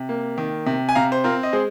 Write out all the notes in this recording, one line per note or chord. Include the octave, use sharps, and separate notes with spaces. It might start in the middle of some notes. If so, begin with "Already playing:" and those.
Already playing: C3
A#3
D#3
C3
G#5
C3 F5 A#5
C5
C4 F4 A#4
D#5
G#3 G#4 C5